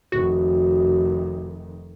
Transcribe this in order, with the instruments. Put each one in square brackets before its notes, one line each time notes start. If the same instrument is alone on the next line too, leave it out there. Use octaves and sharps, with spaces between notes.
[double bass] F1 D#3 [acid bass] F#4